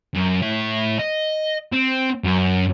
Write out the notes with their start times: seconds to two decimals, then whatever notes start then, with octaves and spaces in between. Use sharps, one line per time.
0.15 F#2
0.42 A2 E5
0.99 D#5
1.72 C4
2.24 F#2